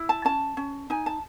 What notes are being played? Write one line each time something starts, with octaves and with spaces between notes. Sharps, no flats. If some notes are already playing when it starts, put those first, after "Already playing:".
Already playing: E4
A5
C#4 A5
C#4
D#4 G#5
A5